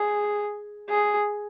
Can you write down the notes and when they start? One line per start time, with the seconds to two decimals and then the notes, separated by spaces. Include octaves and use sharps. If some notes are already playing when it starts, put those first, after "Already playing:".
Already playing: G#4
0.90 G#4